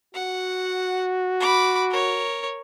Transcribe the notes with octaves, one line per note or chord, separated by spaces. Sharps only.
F#4 F#5
B5 D6
A#4 C#5